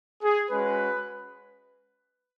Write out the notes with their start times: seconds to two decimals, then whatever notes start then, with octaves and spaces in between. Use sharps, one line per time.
0.22 G#4
0.50 G#3 C#4 F#4 B4